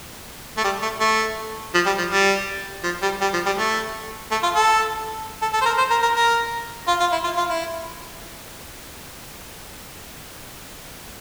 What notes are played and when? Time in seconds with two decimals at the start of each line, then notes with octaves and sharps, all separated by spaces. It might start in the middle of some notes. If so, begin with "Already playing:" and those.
0.57 A3
0.64 G3
0.82 A3
1.00 A3
1.74 F3
1.86 G3
1.98 F3
2.10 G3
2.83 F3
3.02 G3
3.21 G3
3.33 F3
3.46 G3
3.57 A3
4.31 A3
4.43 F4
4.55 A4
5.42 A4
5.53 A4
5.62 C5
5.66 A#4
5.78 C5
5.90 A#4
6.02 A#4
6.14 A#4
6.88 F4
7.00 F4
7.12 E4
7.24 F4
7.37 F4
7.49 E4